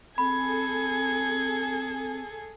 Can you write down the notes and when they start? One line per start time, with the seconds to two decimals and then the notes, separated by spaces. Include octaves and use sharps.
0.18 C4 G#4 A4 B5 G#6